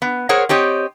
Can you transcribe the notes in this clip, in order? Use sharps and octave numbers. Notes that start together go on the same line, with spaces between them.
B3
G#4 A#4 C5 C#5 F#5
C4 G4 C#5 D#5